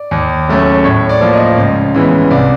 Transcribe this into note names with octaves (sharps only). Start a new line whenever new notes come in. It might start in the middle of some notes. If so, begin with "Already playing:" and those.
Already playing: D5
D#2
C#3 F#3 A3 C#4
A2 C#5
D5
F3 A#3
D#5
C#2
C#3 E3 G#3 B3
C2 D5